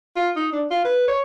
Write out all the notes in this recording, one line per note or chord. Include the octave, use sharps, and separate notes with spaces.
F4
D#4
D4
F4
B4
C#5